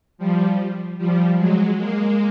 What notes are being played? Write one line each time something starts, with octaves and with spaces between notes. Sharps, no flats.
F3 G3
F3 G3
F#3 G#3
G#3 A#3